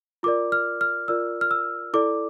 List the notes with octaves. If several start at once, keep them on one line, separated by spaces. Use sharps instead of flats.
F4 A#4 D5 D6
F6
F6
F4 A#4 D5 E6
F6
E6
E4 A4 D5 D6